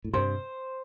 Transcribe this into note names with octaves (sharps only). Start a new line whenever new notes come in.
A2
G2 C3 C5